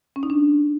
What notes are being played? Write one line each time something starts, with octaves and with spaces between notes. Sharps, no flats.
C#4
D#4
D4